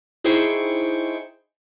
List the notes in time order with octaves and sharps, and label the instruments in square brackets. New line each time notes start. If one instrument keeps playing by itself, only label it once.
[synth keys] D#4 E4 G#4 C5 G5 C#6